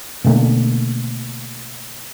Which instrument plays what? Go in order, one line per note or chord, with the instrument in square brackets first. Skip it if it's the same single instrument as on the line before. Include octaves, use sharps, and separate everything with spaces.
[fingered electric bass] B2 D3 A3 A#3